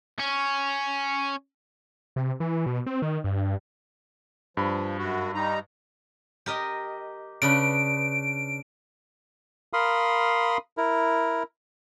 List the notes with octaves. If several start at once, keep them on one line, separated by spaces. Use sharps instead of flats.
C#4
C3
E3
B2
C4
D#3
G2
G2 F3 B5
F#2 F#4
G3 D#4 A#5
G4 A#4 D#5
C#3 D4 B4 D7
A#4 F5 B5 C6 D#6
E4 A#4